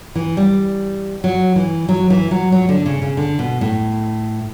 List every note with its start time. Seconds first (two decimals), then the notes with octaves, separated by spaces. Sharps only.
0.15 E3
0.37 G3
1.24 F#3
1.56 E3
1.89 F#3
2.10 E3
2.31 F#3
2.52 F#3
2.69 D3
2.86 C#3
3.02 C#3
3.17 D3
3.39 B2
3.61 A2